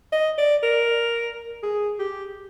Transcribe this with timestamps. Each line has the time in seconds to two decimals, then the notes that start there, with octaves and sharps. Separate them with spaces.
0.12 D#5
0.38 D5
0.63 A#4
1.63 G#4
1.99 G4